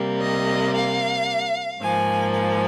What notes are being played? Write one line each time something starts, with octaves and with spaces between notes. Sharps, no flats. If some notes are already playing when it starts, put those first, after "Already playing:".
Already playing: C3 G3 A#3
D#5
F5
G#2 F3 A#3 G#5
G#5